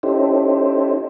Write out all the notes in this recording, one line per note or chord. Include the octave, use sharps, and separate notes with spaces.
C#4 D#4 E4 G4 A4 C5